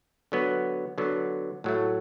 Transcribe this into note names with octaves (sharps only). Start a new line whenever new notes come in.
D3 F#3 B3
D3 F#3 B3
A2 F#3 A3